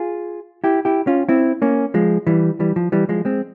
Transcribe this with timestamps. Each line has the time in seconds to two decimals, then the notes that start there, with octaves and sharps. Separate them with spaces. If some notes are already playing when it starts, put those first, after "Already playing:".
Already playing: F4 G#4
0.64 E4 G4
0.85 E4 G4
1.07 C#4 F4
1.29 C4 E4
1.62 A#3 C#4
1.94 F3 G#3
2.27 E3 G3
2.60 E3 G3
2.76 F3
2.92 E3 G3
3.09 F3 G#3
3.25 G#3 C4